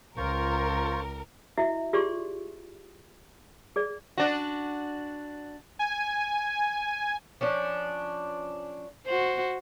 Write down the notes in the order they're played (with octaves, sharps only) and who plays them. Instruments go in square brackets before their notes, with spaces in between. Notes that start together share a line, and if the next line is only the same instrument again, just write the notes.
[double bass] C#2 [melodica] F4 C5 C#6 [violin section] A#4
[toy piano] E4 F#4 D#5 E5
F4 G4 G#4 D5 C6 C#6
G#4 D5
[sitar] D4 F#4
[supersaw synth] G#5
[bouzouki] F3 C#4 D4
[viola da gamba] F#4 C5